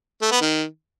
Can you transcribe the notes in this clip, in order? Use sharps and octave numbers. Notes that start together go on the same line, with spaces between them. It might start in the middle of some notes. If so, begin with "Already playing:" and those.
A3
B3
D#3